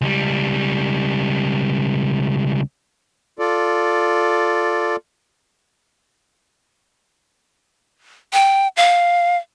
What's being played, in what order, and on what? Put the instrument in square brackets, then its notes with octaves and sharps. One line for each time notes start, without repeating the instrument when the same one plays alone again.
[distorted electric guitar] C#2 G3
[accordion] F4 A4 D5
[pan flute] G5
F5